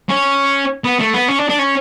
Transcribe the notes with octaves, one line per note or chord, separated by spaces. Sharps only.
C#4
B3
A3
B3
C#4
D4
D4
C#4